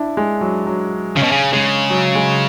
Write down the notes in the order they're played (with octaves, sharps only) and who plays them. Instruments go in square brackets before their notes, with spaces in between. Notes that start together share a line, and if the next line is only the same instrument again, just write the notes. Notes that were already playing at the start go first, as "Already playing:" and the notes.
Already playing: [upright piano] D4 E4
G#3
F#3
F#3
[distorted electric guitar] C#3 [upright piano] C#4
[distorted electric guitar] B2
C#3
[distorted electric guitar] C#3 [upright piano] G#3
[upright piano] F#3
G#3